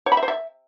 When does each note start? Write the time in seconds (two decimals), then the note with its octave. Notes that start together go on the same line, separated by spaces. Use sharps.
0.06 C#5
0.12 B5
0.17 E5
0.23 C5
0.28 E5